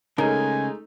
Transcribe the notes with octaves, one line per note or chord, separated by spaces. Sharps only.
C#3 G#3 A3 D#4 A#4 G#5